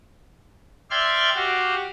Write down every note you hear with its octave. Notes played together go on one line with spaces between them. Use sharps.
D5 E5 G5 C6 F6 G#6
F#4 G4 F5